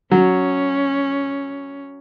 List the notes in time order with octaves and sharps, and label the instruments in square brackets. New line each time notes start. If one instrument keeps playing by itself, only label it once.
[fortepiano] F#3 [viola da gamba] C#4